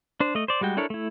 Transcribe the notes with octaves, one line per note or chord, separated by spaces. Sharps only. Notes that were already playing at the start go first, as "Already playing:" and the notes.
D4 C5
A3 D#5
C5 D5
G3 G#3 F#4 G5
D4 E4 A4 A#4 C#5
A3 E4